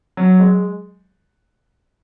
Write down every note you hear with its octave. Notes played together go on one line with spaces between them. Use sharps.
F#3
G#3